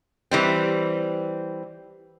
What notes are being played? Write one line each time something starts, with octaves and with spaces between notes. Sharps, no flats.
E3 G3 C4